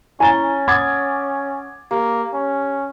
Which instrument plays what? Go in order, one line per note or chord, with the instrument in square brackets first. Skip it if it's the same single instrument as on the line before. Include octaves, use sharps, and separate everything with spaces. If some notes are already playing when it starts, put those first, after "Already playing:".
[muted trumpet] C#4 [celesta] E4 A#5 G7 [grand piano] G#5 A6
[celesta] F#5 D#6 [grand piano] D6 G#6 A6
[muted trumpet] A#3 [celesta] G4
[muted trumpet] C#4